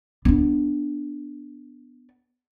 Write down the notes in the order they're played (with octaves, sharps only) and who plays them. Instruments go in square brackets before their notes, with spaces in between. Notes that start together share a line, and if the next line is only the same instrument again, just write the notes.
[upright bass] B3 D4